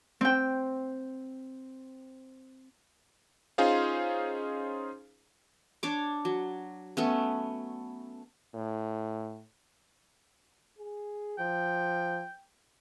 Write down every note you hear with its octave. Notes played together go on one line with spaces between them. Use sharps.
C4 G5
C#4 D#4 F4 G#4 C5 F5
D4 C#5 D6
F#3
A3 B3 C#4
A2
G#4
F3 G5